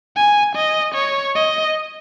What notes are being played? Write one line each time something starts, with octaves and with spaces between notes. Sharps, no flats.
G#5
D#5
C#5
D#5